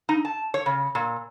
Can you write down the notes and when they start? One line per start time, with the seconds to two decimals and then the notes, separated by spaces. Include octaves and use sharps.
0.09 D#4
0.25 A5
0.54 C#5
0.66 C#3
0.95 A#2